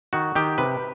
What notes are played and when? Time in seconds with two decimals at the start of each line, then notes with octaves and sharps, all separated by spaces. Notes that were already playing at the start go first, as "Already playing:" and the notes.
0.13 D#3 F#4
0.35 D#3 G4
0.58 C3 B4